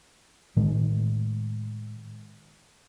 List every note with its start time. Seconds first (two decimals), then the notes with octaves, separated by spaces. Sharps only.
0.56 A2 D#3 G#3